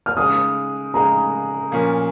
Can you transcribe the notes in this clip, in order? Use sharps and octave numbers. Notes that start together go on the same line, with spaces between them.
F6
C#3 G#3 D#4 G#4 D#6
C#3 G#3 D#4 G#4 A#5
A#2 F3 C#4 A#4